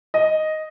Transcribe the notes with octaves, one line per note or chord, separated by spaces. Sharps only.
D#5